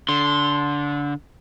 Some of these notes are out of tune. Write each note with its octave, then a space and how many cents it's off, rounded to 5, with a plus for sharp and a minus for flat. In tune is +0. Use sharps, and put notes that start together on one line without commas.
D3 -20 C6 +0